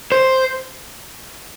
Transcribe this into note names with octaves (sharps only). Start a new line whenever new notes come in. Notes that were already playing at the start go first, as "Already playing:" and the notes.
C5